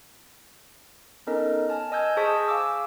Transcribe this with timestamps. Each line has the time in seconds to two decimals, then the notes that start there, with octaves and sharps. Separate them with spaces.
1.27 B3 C#4 D#4 A4 A#4 D#5
1.69 G#5 A5 F6
1.92 D#5 G#5 E6 F6 G6 G#6
2.17 G#4 C5 A5 C#6 D#6 B6
2.48 F5 G#5 D6 E6